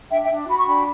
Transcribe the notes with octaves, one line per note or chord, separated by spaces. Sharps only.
D4 E5 G5
E5 G5
D4
F#4 B5
C#6
D4 G5 B5